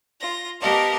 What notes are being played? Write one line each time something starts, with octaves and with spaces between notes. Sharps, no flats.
F4 A#6
B3 G4 A#4 D#5 F5 A5